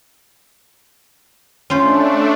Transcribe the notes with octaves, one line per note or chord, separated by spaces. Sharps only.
A3 C#4 D4 F4 C5